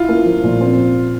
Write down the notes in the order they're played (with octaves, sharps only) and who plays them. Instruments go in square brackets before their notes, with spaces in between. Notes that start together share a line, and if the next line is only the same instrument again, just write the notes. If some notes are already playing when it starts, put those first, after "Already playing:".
Already playing: [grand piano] E4 [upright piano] F4
[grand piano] A#3
F3
A#2
C4